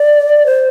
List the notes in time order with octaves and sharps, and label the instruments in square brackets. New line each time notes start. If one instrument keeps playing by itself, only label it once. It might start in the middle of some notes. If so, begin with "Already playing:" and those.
Already playing: [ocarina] D5
C5